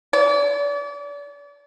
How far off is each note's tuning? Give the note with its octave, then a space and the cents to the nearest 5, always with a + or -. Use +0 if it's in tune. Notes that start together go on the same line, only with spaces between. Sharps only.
D5 -35